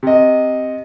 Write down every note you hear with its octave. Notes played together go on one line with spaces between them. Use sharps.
C3 D#5